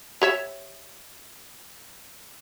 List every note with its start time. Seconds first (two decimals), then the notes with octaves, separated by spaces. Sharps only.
0.22 G4 C#5 E5